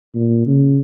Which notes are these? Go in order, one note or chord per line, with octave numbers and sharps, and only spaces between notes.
A#2
C#3